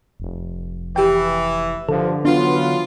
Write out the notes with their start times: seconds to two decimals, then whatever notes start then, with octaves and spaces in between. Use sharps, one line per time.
0.20 F1
0.96 E3 G4 G5
1.89 G2 D3 F3 A4
2.25 E3 F#3 B3 D4 F4